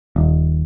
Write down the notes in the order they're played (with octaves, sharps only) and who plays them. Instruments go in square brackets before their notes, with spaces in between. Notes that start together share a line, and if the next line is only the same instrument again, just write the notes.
[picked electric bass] D#1